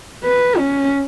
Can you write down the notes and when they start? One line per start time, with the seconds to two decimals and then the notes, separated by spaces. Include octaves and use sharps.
0.24 B4
0.58 C#4